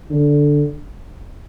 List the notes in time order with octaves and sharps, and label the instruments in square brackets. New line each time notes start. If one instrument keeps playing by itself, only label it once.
[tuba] D3